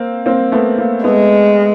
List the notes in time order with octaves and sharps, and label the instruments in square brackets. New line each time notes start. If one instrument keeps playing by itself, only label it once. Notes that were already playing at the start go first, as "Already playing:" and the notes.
Already playing: [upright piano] A#3 C4
A#3 C4
A3 B3
A#3
[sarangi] G#3 [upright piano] A3 B3